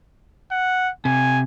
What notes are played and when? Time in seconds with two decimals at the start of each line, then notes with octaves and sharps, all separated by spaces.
0.52 F#5
1.05 C3 G#5